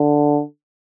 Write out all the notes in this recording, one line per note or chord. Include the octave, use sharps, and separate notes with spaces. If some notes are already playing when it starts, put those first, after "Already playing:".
Already playing: D3